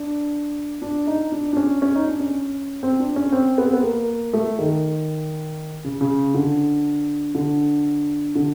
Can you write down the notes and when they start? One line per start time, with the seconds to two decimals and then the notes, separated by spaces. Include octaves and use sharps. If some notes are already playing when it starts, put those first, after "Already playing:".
Already playing: D4
0.82 D4
1.07 D#4
1.32 D4
1.53 D4
1.57 C#4
1.82 C#4
1.95 D#4
2.07 D4
2.20 C#4
2.83 C4
3.00 D4
3.16 C#4
3.32 C4
3.58 B3
3.66 C4
3.73 B3
3.83 A#3
4.33 A3
4.59 D#3
5.85 C#3
6.01 C#3
6.35 D3
7.35 D3
8.35 D3